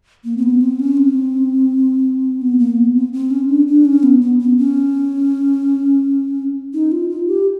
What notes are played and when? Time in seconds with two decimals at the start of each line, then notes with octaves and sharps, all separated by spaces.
0.25 A#3
0.37 C4
0.43 B3
0.61 C4
0.79 C#4
0.97 C4
2.42 B3
2.59 A#3
2.77 B3
2.95 C4
3.13 C4
3.31 C#4
3.49 D4
3.67 D4
3.85 C#4
4.03 B3
4.21 B3
4.39 B3
4.58 C#4
6.74 D#4
6.92 F4
7.10 F4
7.27 G4